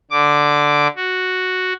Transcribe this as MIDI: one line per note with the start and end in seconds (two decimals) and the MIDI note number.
0.11 0.87 50
0.11 0.87 86
0.96 1.73 66